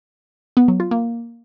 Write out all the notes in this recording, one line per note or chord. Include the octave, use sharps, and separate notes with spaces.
B3
F#3
F4
A#3